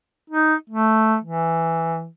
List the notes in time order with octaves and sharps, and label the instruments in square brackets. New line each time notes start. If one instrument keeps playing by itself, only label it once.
[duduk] D#4
A3
E3